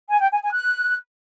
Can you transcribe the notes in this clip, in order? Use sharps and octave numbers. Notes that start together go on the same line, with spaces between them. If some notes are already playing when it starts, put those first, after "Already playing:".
G#5
G5
G#5
G#5
F#6